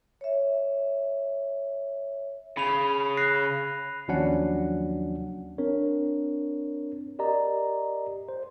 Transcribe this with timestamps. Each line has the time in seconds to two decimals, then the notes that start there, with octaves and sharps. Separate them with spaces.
0.21 C#5 E5
2.57 C#3 B5 D#7 F7
3.17 F#6 A#6 C7
4.08 D#2 F3 F#3 C#4 D4 F#5
5.58 C4 D4 A#4 C#5
7.19 G4 A#4 D5 D#5 A#5
8.29 C5